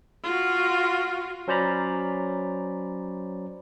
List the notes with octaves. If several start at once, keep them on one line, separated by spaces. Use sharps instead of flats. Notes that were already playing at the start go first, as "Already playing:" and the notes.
F4 F#4
F#3 C#4 C5 D5 A#5 B5